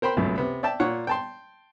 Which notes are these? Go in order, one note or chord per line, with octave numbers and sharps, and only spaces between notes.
A#4 C5 G5 B5 C6
C#2 F#2 B2 A3
C3 B3
D5 E5 G5 A5
A#2 C#5 F#5
G5 A5 C6